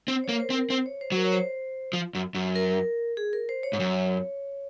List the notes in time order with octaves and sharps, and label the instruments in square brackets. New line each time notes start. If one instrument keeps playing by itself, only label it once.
[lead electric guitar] C4 [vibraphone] C5
[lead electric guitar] A#3 [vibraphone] C#5
[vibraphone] A#4
C5
[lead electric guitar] C4
[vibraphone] A#4
[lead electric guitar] C4 [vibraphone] C5
[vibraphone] C#5
C5
[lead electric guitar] F#3
[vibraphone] A#4
C#5
C5
[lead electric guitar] F3
F#2
F#2
[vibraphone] A#4
G#4
A#4
C5
C#5
[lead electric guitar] G#2
F#2